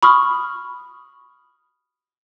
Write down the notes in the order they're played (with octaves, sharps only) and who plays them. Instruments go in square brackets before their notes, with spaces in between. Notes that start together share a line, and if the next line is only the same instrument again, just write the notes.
[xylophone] B5 C#6 D#6 F6